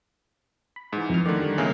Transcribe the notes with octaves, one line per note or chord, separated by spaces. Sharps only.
B5
G#2 E3
F2 F6
D3 D#3 A3 D5
G3
B1 C#3 G#3 A#3 E4 G#4